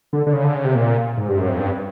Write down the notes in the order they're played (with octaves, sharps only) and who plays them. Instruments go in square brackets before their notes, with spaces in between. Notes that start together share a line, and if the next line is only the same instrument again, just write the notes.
[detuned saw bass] D3
D3
C#3
D3
C#3
C3
A#2
G#2
G2
F#2
F2
G2